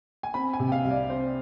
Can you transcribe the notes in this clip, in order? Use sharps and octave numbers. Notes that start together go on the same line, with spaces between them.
G#5
C4 B5
G#5
C3
G5
F5
C2
D5
C4 C5